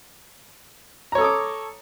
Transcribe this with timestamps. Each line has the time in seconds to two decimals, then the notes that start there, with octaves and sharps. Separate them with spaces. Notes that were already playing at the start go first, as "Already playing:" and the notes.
1.12 A#5
1.15 C#5
1.18 A4
1.21 D#6
1.24 D6